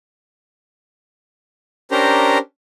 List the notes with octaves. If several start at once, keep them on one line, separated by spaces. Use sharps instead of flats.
C#4 D4 G4 A#4 C5 A#5